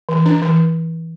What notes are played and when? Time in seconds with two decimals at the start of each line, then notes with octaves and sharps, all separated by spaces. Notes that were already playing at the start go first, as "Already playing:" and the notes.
0.09 E3
0.26 D4
0.42 E3